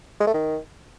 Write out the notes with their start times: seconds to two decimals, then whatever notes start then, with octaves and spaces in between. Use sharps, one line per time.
0.20 G#3
0.27 A3
0.34 D#3